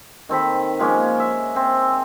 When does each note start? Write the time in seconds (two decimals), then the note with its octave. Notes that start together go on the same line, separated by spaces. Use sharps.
0.29 D#3 C4 A4 B5
0.79 F3 G#3 A#3 C#4
1.20 E5
1.56 C4